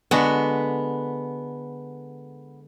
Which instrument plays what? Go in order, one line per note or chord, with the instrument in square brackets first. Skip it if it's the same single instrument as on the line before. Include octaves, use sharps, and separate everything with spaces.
[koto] D3 G#3 F#4 [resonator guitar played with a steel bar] B3